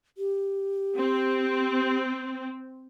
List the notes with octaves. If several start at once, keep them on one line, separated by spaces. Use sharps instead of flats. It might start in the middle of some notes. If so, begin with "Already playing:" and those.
G4
C4